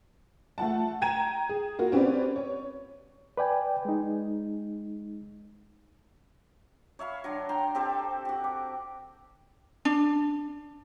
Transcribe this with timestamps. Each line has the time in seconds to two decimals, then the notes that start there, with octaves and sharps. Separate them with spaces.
0.58 A3 F4 F#5 A5
1.01 G5 A#5 G#6 D#7 E7
1.49 G#4
1.79 A#3 F4 F#4
1.92 C4 C#4 G4 B4 C5 D5
2.36 C#5
3.37 B4 D5 G5 G#5
3.85 G#3 D#4
6.99 C#5 E5 F5 B5
7.24 F#3 D4 C6
7.49 G5 A#5 C6
7.75 C4 G4 A4 C5
8.25 F#4 G4
8.44 D6
9.85 D4